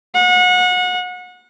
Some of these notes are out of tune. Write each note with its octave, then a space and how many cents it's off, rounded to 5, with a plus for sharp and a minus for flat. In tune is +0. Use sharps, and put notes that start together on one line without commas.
F#5 -30